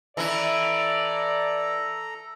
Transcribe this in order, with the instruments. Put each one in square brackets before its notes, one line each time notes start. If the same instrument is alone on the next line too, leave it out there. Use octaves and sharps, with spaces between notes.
[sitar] E3 E4 [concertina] A4 A#5 [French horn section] D5